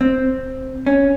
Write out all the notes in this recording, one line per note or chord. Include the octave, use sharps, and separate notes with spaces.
C4
C#4